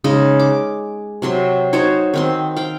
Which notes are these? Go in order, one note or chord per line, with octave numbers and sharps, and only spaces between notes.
C#3 G#3 D#4 D#5
D6
C3 F#3 C6
D#4 F#4 C5 C#5
D#3 C4 C6
F5 G5